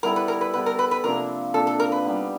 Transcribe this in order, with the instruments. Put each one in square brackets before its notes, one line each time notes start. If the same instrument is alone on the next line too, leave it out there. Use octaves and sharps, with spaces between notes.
[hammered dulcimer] G3 B3 E4 A4 [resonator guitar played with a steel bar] A#4
[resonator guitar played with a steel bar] B4
A#4
B4
[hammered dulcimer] G3 B3 E4 A4 [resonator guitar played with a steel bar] B4
[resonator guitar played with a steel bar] A#4
B4
B4
[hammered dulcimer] C3 F3 A#3 D4 [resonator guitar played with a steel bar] A#4
[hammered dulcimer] C3 F3 A#3 D4 [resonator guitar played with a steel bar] A4
[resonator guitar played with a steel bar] A4
A#4
B4
[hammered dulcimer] G3 B3 D#4 G4